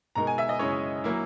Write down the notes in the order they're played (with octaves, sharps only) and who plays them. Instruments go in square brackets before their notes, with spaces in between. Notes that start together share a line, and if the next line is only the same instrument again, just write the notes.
[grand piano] B2 G#3 D#4 A#4 [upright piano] A#5
[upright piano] G#5
E5
D#5
[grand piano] F#2 C#3 G#3 C#4 E4 [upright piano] C#5
[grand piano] F#3 A#3 E4